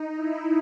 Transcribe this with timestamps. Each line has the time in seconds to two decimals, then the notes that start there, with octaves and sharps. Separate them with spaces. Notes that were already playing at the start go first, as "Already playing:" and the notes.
Already playing: D#4
0.15 E4